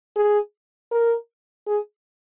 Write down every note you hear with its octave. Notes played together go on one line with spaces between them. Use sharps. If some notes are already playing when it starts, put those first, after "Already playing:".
G#4
A#4
G#4